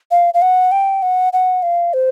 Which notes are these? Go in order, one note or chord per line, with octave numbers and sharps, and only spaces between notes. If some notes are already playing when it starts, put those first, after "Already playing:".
F5
F5
F#5
G5
F#5
F#5
F5
C5